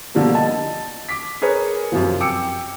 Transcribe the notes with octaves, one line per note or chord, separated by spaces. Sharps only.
B2 D3 F3 G3 A#3
D#5 A5
D6 B6
G#4 A#4 B4 C#5
F#2 C3 F3
G5 D6 E6 C#7